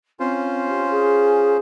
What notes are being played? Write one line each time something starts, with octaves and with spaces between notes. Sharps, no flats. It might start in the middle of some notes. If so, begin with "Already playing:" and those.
C4 C#4 F4 C5
G4
G#4